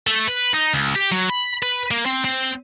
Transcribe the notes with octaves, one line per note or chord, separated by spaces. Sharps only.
A3
B4
D#4
C#2
G4
F#3
B5
B4
A#3
C4
C4